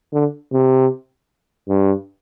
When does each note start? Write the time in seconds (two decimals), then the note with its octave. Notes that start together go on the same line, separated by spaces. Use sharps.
0.13 D3
0.52 C3
1.68 G2